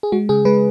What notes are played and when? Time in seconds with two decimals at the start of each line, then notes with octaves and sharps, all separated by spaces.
0.03 G#4
0.12 G#3 F#4
0.29 C#3 G#4
0.45 G#3 B4